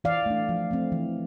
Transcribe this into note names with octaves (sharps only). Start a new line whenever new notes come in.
E3 D5 F5
A3 D4
F3
A3 C4
E3